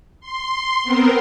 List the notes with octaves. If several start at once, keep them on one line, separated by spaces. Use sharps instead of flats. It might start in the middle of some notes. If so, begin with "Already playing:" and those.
C6
B3 C4 A#4